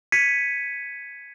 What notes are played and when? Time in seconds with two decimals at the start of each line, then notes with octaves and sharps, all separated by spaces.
0.12 G#6 B6 C#7 D#7